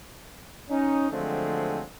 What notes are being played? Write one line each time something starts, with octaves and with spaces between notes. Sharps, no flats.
C#4 D#4
D3 F3 F#3 G#3 A3 C4